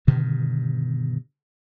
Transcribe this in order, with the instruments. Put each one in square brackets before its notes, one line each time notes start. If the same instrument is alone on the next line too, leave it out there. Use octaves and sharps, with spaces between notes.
[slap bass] G2 B2 D3 D#3